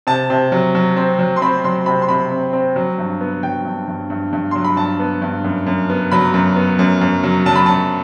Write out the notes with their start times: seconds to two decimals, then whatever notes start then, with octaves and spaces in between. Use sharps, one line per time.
0.07 C3 A5
0.30 C3
0.52 F#3
0.75 F#3
0.97 C4
1.19 F#3
1.36 C6
1.42 C4 B5
1.64 F#3 C6
1.86 C3 B5
2.02 C6
2.09 C3 B5
2.31 C4
2.53 C4
2.76 F#3
2.98 G2
3.21 B3
3.43 F#3 G5
3.65 G2
3.88 G2
4.10 G2
4.33 G2
4.51 F#3 C6
4.64 B5
4.77 G2 A5
4.99 B3
5.22 G2
5.44 F#2
5.66 F#2
5.90 B3
6.12 F#3 B5
6.34 F#2
6.56 B3
6.79 F#2
7.01 F#2
7.23 F#3
7.46 F#3 A5
7.56 B5
7.66 F#2 A5